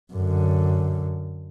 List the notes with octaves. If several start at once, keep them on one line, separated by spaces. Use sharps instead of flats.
F#2 D3